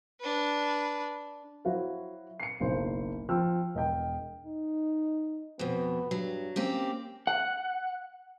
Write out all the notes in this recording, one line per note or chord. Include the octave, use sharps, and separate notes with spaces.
D4 B4
F#3 E4 F#4 C5 F5
C7 C#7
F#1 B1 C5
F3 G5 E6 F6
E1 D#5 G5
D#4
F2 B2 B3
G2 F#3
A#3 C4 C#4 G4
F#5